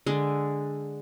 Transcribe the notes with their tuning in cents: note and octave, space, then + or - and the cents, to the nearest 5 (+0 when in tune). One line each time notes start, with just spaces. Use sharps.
D3 +0 G#3 -5